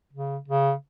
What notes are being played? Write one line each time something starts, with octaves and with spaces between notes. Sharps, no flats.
C#3
C#3